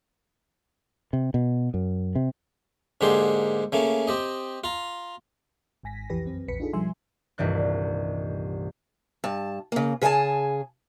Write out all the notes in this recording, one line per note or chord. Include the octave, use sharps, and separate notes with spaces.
C3
B2
F#2
C3
G#2 D3 A#3 G4 G#4 C6
C#3 A3 A#3 C#4
C4 G4 D#5
F4 A#5
G#1 G#2 G#5 A#6 B6
B1 F2 E3 G4 B4 A#6
F#2 C4
A#1 E2 B4 B6 C#7
D4 D#4 F4 G#4 A4
B2 F3 G3 E5 G#5 C6
D#1 C2 G2 E3 F#6
G2 A5
C#3 A#3
C#3 G#4 E5 G#5 A5